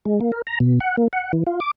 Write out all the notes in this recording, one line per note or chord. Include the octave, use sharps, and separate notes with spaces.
G#3
A#3
A#4
A#5
B2
F#5
A#3
F#5
E3
F4
D6